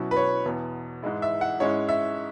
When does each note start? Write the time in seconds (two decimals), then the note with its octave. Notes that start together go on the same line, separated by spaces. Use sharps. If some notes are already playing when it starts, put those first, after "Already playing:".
Already playing: B2 F#3 C#4 E4
0.11 B4
0.16 C#5
0.46 E2 B2 B3
1.03 G#2 E3 G#3 E4
1.22 E5
1.41 F#5
1.60 G#2 G#3 C#4 E4 C#5
1.89 E5